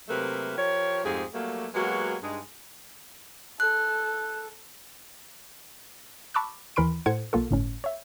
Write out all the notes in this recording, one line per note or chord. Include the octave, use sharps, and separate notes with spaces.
C3 F#3 A3 A#3 A#4 B4
F3 G4 A#4 C#5
F2 G#2 A3 G4 G#4
F#3 G3 A3 A#3
F#3 G#3 A#3 B3 F#4 G4
G2 G#3 D#4
A4 F#6
A5 B5 C#6 D6 E6 F#6
D#2 E3 A#4 B5 C6 D7
A2 A4 C5 F#5 G#6 C#7
B1 A#3 F4 A4
G1 A2 C#4
C#5 E5